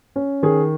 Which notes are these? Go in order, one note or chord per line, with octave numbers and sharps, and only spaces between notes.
C#4
D#3 G#4